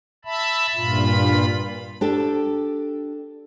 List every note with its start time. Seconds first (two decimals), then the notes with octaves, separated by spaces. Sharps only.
0.25 E5 A5 B5
0.75 G2 A#2 F4 B5
2.01 D4 G4 A4